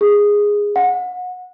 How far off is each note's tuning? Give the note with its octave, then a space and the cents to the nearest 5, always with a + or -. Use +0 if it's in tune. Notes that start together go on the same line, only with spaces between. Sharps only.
G#4 -10
F#5 -30